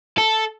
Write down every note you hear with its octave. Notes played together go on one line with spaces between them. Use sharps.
A4